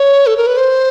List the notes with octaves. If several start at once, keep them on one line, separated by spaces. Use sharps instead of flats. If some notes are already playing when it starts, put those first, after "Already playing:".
Already playing: C#5
A4
A#4
B4
C5